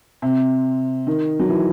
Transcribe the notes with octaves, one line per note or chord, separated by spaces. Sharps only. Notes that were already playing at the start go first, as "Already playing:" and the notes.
C3
D#3
F#3
E3